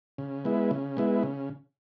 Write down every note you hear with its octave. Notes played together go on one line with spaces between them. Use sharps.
C#3
G#3 B3 E4
C#3
G#3 B3 E4
C#3